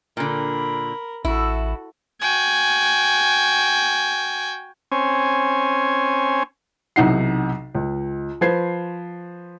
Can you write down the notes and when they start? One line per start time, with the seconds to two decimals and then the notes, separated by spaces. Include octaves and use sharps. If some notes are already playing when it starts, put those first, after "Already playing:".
0.17 A#2 D3 A#4 B5
1.25 A1 E4 F#4 A4
2.22 F#4 G5 G#5
4.92 C4 C#4 G#5
6.96 B1 C3 E3 D#4 F#5 C7
7.75 C#2
8.41 F3 B4 C5 G#6 C7